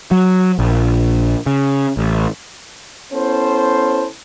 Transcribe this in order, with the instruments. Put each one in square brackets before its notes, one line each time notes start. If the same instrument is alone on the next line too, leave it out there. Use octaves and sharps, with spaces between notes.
[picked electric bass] F#3
A#1
C#3
A1
[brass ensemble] B3 C#4 E4 A4 C5